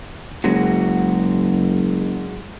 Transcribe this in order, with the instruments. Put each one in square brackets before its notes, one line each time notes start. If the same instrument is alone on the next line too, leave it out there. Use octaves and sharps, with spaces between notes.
[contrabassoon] F#1 [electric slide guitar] F#3 G#3 F#4